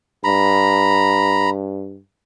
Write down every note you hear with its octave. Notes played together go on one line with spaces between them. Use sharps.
G2 A#5 B5